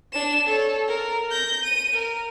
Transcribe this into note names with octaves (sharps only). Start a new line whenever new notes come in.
D4 E7
A4 C#5
A#4
G6 A#6
D#7
A#4